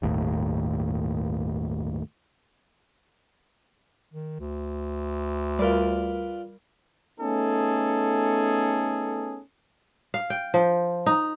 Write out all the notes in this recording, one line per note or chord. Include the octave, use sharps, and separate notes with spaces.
G1 D#2 A2
D#3
D2
G3 F4 A#4 B4 D5
A3 B3 C#4 D#4 G#4 A4
F5
G5
F3
D#4